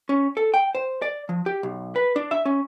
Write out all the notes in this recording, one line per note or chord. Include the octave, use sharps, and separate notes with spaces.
C#4
A4
G5
C5
D5
F3
G4
B1
B4
D4
E5
C#4